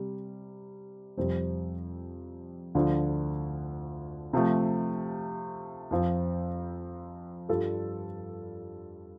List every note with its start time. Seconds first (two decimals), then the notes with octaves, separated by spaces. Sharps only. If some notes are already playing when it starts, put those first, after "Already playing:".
Already playing: C3 G3
1.17 F2 C3 G3 C4
2.75 D2 D3 F3 A3 F4
4.33 C3 F3 A3
5.91 F2 F3 C4 F4
7.49 G2 G3 F4 A4